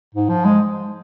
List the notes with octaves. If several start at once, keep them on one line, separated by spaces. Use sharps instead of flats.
G#2
F3
G#3